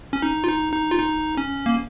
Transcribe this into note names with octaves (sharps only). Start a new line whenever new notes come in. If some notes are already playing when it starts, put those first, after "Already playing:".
C#4
D#4
F4
D#4
D#4
F4
D#4
C#4
A#3